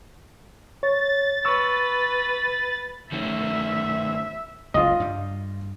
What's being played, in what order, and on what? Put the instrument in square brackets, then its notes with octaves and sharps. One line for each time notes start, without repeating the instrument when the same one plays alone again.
[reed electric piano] C#5 [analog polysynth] A6
[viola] B4 [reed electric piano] C#6 E6
[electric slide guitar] D#3 A3 C#4 [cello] E5
[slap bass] F#1 C#2 [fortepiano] F4 D#5
[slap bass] G2 G3